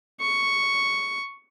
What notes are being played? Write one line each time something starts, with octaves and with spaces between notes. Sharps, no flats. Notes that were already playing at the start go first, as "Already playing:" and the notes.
C#6